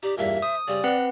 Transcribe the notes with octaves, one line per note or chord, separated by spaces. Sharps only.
D#4 G4 D5
E2 G2 A#2 E5
C5 D#6
C#3 G3 C4 D5
C4 B4 D#5 F#5 B5